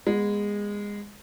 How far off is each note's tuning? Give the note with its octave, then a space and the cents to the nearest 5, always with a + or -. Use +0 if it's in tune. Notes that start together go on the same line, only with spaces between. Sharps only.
G#3 -20 B3 -25